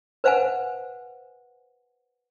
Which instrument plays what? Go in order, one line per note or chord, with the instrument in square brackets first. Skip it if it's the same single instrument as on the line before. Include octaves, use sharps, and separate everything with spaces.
[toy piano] B4 C5 F5 F#5 G#5